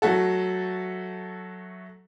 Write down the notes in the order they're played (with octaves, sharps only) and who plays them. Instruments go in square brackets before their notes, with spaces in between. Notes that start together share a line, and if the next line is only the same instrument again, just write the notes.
[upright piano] F#3 A3 F#4 A4